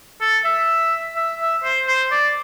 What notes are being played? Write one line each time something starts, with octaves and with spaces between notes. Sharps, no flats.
A4
E5
E5
E5
C5
C5
D5